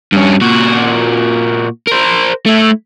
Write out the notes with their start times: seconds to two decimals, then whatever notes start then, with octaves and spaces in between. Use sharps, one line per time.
0.12 G2 C#4
0.41 A#2 F#4
1.87 A#4 C5
2.46 A3 E4